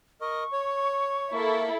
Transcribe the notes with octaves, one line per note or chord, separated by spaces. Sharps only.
A#4 D#5 C#6
C#5
A#3 E4 A4